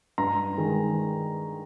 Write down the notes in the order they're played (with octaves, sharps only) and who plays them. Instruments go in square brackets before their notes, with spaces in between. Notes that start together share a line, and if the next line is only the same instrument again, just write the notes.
[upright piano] G2 A#5
D#3 G#3